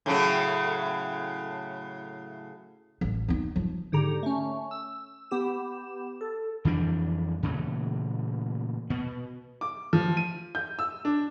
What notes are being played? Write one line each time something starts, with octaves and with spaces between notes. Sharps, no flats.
A2 C#3 F#3
A1
B3 D#4
F3
G#2 D3 G4 A#5
A3 C#4
E6
B3 G4 E7
A4
F2 E3 G3 D4
A#2 C#3 E3 A3
B2 B3
D6
F3
D#7
G6
E6
D4